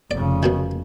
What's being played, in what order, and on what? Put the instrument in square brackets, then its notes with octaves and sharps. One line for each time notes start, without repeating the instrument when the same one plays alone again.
[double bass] F1 C#3 [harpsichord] D5
[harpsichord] F#2 B2 D#3